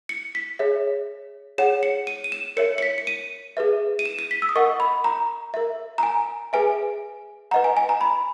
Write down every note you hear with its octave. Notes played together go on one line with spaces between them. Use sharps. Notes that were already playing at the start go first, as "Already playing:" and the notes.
C#7
B6
G#4 C#5 E5
G#4 C#5 F#5 E7
C#7
D#7
D#7
E7
A#4 C#5 E5 C#7
C#7
B6
C#7
D#7
G#4 B4 E5
D#7
E7
D#7
B6
E6
D#6
A#4 D#5 F#5 C#6
B5
A#5
A#4 E5
A#5
G#5
G#4 B4 E5 G#5
B4 D#5 F#5 A#5
G#5
G#5
A#5
B5